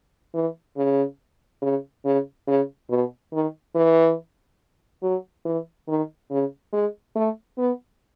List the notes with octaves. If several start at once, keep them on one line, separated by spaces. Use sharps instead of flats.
E3
C#3
C#3
C#3
C#3
B2
D#3
E3
F#3
E3
D#3
C#3
G#3
A3
B3